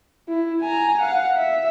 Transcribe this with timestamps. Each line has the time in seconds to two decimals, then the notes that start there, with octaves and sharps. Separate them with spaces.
0.29 E4
0.61 G#5 A#5
1.01 F5 F#5
1.37 E5